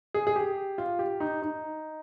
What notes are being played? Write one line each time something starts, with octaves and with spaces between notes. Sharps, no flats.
G#4
G#4
G4
F4
G4
D#4
D#4